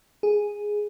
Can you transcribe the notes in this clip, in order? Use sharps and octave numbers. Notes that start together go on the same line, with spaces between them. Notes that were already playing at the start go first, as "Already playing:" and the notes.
G#4